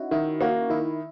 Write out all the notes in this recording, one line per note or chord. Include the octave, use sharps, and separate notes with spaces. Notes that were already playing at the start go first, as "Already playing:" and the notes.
Already playing: C#4 D#4 E4 F#4
D#3 E4
A#3 F#4
D#3 E4